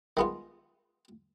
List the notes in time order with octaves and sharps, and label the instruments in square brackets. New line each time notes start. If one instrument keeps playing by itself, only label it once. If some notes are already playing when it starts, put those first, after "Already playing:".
[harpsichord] D#3 G#3 B3 F4